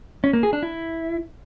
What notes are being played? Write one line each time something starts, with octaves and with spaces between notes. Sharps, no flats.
C#4
A#3
G#4
D4
E4